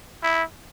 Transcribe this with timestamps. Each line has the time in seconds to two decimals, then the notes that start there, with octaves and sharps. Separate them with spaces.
0.23 E4